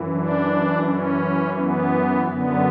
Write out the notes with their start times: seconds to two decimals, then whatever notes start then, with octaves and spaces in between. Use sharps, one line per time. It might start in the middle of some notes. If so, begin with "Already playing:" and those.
Already playing: F#2 E3
0.15 D4
0.86 C#4
1.57 B3
2.28 F#2 D3 F#3 B3